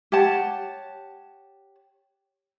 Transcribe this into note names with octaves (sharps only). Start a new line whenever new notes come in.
G4 C#5 F#5 A5